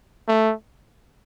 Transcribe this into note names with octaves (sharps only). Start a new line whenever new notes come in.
A3